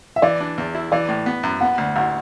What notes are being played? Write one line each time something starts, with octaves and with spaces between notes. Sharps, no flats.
E5
E3 D5
D4
E2
E4
E3 D5
A2
B3
F#2
B3 F#5
D2
A1 F#5